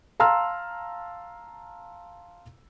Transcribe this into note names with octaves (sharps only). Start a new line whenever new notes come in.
F5 A5 A#5 C6 E6 F6